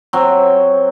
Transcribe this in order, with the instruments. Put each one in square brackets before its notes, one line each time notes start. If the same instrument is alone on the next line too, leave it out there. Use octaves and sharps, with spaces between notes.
[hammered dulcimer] F#3 C4